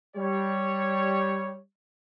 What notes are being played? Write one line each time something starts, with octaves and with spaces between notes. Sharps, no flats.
G3 C#5